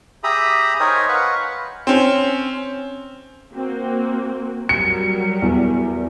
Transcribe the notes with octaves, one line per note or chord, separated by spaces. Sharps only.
G4 G#4 E5 A#5 B5 D#6
D#4 A#4 C5 C#5 G5 G#5
B4 F5 F#5 C#6
C4 C#4
A#3 C4 F#4
F#3 G3 A#4 C#7
E2